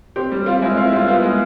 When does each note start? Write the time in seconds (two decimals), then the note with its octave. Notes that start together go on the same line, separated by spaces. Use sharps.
0.16 C4 G4
0.32 G3
0.46 C4 F4
0.62 G#3 E4
0.77 C4 F4
0.87 E4
0.92 G3 F4
1.07 B3 F4
1.22 G#3